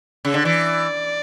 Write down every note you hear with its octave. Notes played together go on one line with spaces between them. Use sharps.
C#3
D3
E3 D5